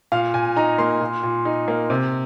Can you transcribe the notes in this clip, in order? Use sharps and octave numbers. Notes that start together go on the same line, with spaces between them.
A#2 F5
A#2 G#5
D#4 A#5
A#3 C6
A#2
A#2
D#4
A#3
C3